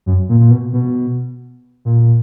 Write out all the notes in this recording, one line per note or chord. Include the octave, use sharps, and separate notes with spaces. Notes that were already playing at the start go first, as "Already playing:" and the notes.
F#2
A#2
A#2
B2
B2
A#2